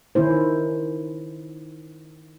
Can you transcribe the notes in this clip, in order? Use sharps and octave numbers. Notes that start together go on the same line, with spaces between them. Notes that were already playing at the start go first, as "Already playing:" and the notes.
D#3 C#4 E4 C5